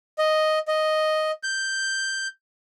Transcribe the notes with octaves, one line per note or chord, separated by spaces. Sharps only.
D#5
D#5
G6